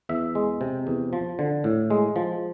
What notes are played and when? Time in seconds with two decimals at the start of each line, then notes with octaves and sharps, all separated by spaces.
0.09 E2 E5
0.35 G#3
0.61 C3
0.87 E2
1.13 F3
1.39 D3
1.64 A2
1.90 G#3
2.16 F3